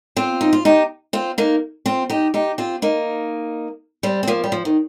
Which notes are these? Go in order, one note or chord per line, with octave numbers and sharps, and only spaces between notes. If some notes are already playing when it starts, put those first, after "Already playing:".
C4 F4
D#4
F4
D#4 G4
C4 F4
A#3 D#4
C4 F4
D#4 G4
D#4 G4
C4 F4
A#3 D#4
G3 C4
C4
F3 A#3
G3
F3
D#3